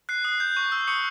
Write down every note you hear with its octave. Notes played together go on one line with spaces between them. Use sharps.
F#6 C7
D#6 C7
G6
C#6
E6 G6
C#6 D#6 C#7